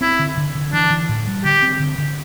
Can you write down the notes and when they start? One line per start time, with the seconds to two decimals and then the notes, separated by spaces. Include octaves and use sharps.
0.01 C4 E4
0.19 D3
0.38 D3
0.55 D3
0.73 E3 D4
0.91 E3
1.09 A2
1.27 G3
1.45 D3 G4
1.62 C4
1.80 D3
1.98 D3